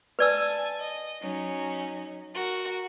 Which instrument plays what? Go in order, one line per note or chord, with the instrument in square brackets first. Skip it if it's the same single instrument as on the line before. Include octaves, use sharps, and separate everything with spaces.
[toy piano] B4 D5 E6 [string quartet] G#5 A5
[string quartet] D#5
F#3 C#4 D#4
F#4 A#4